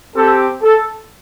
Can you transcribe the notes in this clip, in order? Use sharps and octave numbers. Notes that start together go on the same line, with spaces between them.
C4 G4 A4
A4